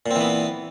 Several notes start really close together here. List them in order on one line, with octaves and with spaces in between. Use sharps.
A#2 C4 E3 B3